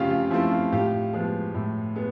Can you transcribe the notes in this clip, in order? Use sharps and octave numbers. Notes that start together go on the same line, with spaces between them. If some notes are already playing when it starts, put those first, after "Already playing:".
Already playing: C#3 F3 A3 C4 F4 G4
F4
F3 A3 C4 E4
F4
A2 F4 G4
F3 G#3 B3
A2
G#3 B3